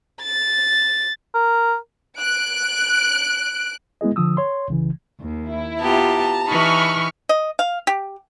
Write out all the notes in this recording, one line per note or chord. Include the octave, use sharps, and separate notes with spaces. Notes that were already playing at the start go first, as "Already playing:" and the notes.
A6
A#4
F#6 D7
G#3 B3 E4 G#4 D#5
D3 F3 D#6 E6
C#5 C6
C2 C#3 E3
D#2
E4
B3 F4 G4 A5 A#5
E3 D#4 B5 C#6 F6
D#5
F5
G4